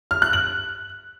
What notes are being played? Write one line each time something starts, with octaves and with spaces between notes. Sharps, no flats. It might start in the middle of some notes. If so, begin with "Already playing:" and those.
F6
F#6
F#7